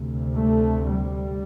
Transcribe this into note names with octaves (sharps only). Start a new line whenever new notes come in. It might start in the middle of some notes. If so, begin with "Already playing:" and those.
Already playing: D2 C3
A3
G3